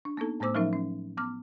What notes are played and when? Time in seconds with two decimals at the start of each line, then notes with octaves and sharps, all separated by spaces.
0.05 D4
0.17 A#3 B3 D#4 A4
0.40 A2 A3 B3 C5 D6 E6
0.55 F3 F#3 C#4 D#4 A#4 E5
0.73 C#4
1.17 B3 D6 F6